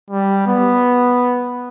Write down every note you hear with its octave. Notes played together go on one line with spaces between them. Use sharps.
G3
B3